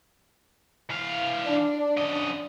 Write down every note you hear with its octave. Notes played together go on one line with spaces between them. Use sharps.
E3 F5
D4
F#2 D#5